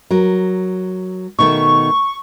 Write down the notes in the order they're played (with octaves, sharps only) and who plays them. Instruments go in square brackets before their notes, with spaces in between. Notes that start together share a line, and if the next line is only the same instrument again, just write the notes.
[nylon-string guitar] F#3 A#4
[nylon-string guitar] B2 D#3 A3 [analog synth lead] C#6